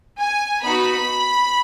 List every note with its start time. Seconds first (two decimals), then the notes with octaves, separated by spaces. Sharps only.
0.19 G#5
0.62 B3 D#4 F#4 B5